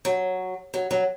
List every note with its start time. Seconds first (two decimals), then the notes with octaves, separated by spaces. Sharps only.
0.05 F#3
0.74 F#3
0.91 F#3